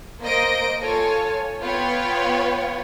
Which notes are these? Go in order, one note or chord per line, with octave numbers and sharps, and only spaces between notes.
A#3 C5 D#5 A#6 D7
F4 A4 C#5 G#5
B3 F4 B4 C#5 G5